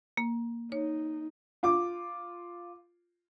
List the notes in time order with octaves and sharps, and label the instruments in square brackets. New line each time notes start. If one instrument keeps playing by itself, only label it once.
[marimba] A#3
[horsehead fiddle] D#4 [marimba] C#5
[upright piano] F4 D6